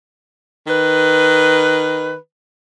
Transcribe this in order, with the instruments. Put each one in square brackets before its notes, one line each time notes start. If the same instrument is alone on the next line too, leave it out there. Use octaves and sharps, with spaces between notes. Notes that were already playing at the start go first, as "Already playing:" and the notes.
[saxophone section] D#3 B4